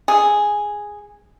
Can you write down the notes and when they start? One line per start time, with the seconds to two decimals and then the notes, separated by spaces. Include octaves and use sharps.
0.08 G#4